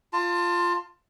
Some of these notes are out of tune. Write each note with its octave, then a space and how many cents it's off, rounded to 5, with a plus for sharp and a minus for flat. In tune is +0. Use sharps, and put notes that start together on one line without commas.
F4 +0 A5 +25